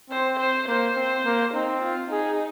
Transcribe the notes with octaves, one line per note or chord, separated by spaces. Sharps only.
C4 C5
C5
A#3 C5
C4
A#3
C4 D#4
F4
D#4 G#4